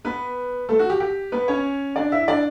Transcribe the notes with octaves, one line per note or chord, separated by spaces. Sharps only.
B3 B4
A3 A4
F#4
G4
G4
B3 B4
C#4 C#5
D4 D5
E4 E5
D4 D5